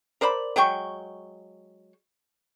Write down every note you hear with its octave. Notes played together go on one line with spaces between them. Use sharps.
A#4 C5 D5 B5
F#3 G#3 G5 C#6